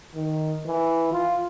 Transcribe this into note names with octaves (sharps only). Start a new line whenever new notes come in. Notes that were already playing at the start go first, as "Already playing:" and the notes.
D#3
E3
F4